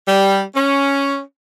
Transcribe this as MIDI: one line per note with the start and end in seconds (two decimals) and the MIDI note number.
0.07 0.40 55
0.55 1.19 61